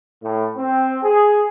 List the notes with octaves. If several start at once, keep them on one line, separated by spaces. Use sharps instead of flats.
A2
C4
G#4